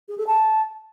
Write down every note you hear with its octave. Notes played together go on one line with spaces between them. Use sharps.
G#4
A4
A5